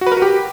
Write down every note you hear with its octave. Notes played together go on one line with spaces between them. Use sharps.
F#4
B4
A#4
F#4
G4